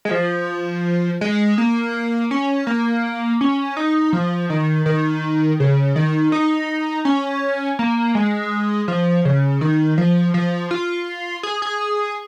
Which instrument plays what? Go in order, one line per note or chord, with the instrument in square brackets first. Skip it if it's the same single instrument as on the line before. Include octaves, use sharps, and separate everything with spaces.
[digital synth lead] G#3
F3
G#3
A#3
C#4
A#3
C#4
D#4
F3
D#3
D#3
C#3
D#3
D#4
C#4
A#3
G#3
F3
C#3
D#3
F3
F3
F4
G#4
G#4